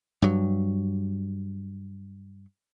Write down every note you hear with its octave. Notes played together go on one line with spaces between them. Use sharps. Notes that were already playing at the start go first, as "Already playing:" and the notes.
G2 F#3